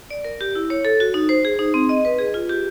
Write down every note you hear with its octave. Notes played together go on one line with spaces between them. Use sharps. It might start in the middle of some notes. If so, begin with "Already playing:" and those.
D5
A#4
G4
E4
C#5
A4
F#4
D#4
C5
G#4
D#4
C4
D#5
B4
G#4
F4
G4